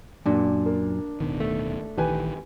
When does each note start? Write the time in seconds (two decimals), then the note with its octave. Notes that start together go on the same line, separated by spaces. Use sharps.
0.26 F#2 A#2 D4
0.66 A#3
1.20 D1 B2 D#3
1.40 A3
1.98 A#1 D#3 E3 G4 B4 G#5